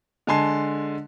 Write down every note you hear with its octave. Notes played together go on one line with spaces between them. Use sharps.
D3 G#3 G#5 A5 C6 C7